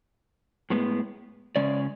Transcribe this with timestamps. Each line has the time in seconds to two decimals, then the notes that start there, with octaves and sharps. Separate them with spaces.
0.70 A2 G#3 B3
1.56 C#3 G#3 C#4 D5